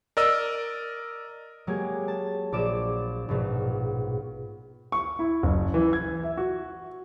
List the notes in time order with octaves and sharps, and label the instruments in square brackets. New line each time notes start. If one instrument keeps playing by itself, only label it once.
[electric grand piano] A#4 D5 D#5 E6
[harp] F#3 G#3 A#3 G4 G#5
A5
A#1 D5 D6 E7
A#1 G#2 B2
[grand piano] C#6
E4
F#1
E3
G#6
E5
F#4